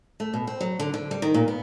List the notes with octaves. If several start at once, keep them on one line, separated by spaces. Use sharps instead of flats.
A3
B2
C4
F#3
D3
D3
G3
D#3
A#2
B3